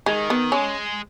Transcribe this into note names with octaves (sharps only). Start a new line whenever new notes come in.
D#3 G#3
B3
G#3 C#4